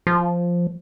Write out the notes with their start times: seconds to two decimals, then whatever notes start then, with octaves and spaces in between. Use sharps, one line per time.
0.07 F3